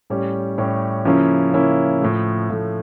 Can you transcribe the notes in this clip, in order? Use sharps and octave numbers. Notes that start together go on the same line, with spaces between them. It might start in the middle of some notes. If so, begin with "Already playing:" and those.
A2 G3 C#4 G4
A2 G3 C#4 G4
C#3 F3 A#3 C#4 E4
C#3 F3 A#3 C#4 E4
A2 F3 A3
A2 F3 A3